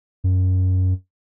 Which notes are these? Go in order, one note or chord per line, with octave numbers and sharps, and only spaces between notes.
F#2